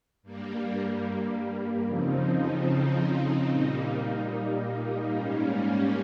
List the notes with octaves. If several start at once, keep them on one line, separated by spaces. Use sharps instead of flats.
G2 G3 A#3
F2 C#3 F3 C4 D#4
A#2 G3 A#3 D#4
G#2 G3 A#3 C#4